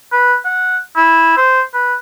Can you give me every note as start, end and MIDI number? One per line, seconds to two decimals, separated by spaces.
0.12 0.35 71
0.45 0.77 78
0.96 1.34 64
1.37 1.61 72
1.74 1.94 71